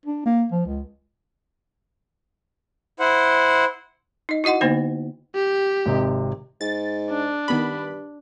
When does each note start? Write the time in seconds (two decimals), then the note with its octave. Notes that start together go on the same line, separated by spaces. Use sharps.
0.05 D4
0.26 A#3
0.52 F3
0.66 C#2
3.00 E4 C5 F#5
4.29 D#4 D#5
4.44 E4 F#4 D#5 F#5 C6
4.61 D3 A#3 B3 D#4 C5
5.35 G4
5.86 G#1 C3 D#5
6.61 G#2 A6
7.11 D4
7.48 G2 D#3 B3 B5